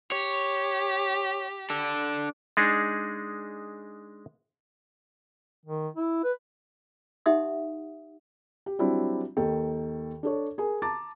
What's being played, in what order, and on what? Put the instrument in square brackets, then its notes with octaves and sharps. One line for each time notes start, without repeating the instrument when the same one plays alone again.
[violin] G4 [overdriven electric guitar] C#5
[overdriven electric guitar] D4 A4
[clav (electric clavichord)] G#3 D4 D#4 G#4
[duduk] D#3
E4
B4
[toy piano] D#4 G4 E5 F#5 C6 D#6
[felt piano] G4
F#3 G3 C4 D4 E4 G4
D#2 D#3 A4 G5
D4 A4 C#5
G#4 A#4 G#5
A5 A#5 D6 A6